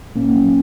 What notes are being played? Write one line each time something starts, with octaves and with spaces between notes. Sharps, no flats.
A#2 A#3 C#4
F#3